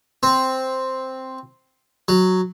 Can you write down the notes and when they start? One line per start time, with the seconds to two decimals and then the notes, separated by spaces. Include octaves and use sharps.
0.23 C4
2.08 F#3